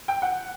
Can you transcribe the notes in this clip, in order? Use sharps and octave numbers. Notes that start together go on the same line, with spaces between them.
G5
F#5